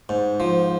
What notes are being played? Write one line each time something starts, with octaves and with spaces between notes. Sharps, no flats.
G#2
F3